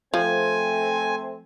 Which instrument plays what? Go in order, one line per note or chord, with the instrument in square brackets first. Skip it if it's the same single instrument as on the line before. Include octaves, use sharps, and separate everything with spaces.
[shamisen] F3 [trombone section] A3 C4 [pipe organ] G#5